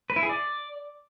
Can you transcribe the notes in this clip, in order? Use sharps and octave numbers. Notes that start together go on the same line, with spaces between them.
B4
E4
G#4
D5